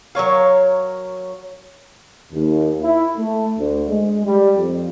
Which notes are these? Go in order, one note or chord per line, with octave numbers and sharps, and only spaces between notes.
F#3 A#4 C#5 F5
D#2
E4
A3
D2
G#3
G3
F2